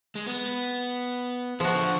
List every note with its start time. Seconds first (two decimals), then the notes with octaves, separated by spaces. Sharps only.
0.15 G#3
0.27 B3
1.60 F3 F#4 G#4 E5
1.75 D3